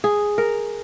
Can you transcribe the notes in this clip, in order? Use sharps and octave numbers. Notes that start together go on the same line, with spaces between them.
G#4
A#4